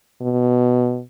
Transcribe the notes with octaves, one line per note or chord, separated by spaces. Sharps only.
B2